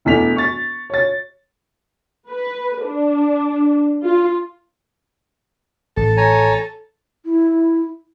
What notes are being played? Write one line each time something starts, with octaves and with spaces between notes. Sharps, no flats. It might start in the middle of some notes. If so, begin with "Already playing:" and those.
E1 E2 A3 B6 F7
C#6 A6
C#5 A6
B4
D4
F4
A1 A4
C#5 G#5 A#5
E4